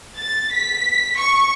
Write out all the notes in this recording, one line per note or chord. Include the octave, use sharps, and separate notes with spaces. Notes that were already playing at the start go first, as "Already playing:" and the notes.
A6
B6
C#6